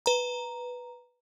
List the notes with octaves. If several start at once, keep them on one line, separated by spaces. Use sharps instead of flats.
B4 A#5